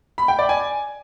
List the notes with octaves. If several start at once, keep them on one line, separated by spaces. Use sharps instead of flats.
B5
G5
D5
G#5